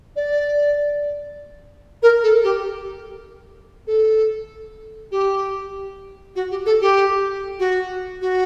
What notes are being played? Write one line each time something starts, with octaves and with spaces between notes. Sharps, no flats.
D5
A#4
A4
G4
A4
G4
F#4
G4
A4
G4
F#4
F#4